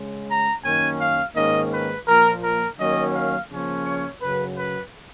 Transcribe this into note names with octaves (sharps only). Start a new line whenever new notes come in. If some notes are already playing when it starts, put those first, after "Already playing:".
Already playing: C#3 G#3 C#4
A#5
F#2 D#3 A#3 C#4 G#5
F5
G#2 D#3 A#3 C#4 D#5
B4
A#2 F3 A#3 A#4
A#4
D#3 F#3 A#3 C#4 D#5
F5
C#3 F3 A#3 C#4
C#5
F#2 C#3 F#3 B4
B4